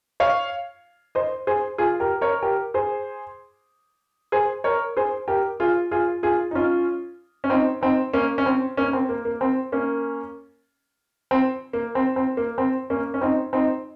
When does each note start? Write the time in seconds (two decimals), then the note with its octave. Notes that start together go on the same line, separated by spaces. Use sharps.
0.20 C#5 F5
1.15 C5 D#5
1.47 G#4 C5
1.78 F4 G#4
2.00 G4 A#4
2.21 A#4 C#5
2.42 G4 A#4
2.74 G#4 C5
4.32 G#4 C5
4.64 A#4 C#5
4.97 G#4 C5
5.28 G4 A#4
5.60 F4 G#4
5.91 F4 G#4
6.23 F4 G#4
6.51 D#4
6.55 C#4 F4
7.44 C#4
7.50 C4 D#4
7.81 C4 D#4
8.13 A#3 C#4
8.38 C#4
8.46 C4
8.77 A#3 C#4
8.93 C4
9.09 A#3
9.25 A#3
9.41 C4
9.72 A#3 C#4
11.31 C4
11.73 A#3
11.95 C4
12.16 C4
12.37 A#3
12.58 C4
12.90 A#3 C#4
13.14 C#4
13.22 C4 D#4
13.53 C4 D#4